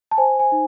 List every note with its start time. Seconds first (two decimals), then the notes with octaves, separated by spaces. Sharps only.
0.11 A5
0.17 C5 G#5
0.39 G#5
0.52 D#4